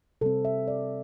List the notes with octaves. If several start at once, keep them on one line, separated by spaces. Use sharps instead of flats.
C3 G3 C4 A4
E5
D5